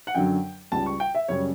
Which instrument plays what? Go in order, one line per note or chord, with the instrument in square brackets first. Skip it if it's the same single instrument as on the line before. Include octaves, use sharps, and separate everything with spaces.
[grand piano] F#5
F#2 D3 F#3 G5
C#2 C#3 G3 A5
C#6
G5
E5
F#2 C#3 G3 C#5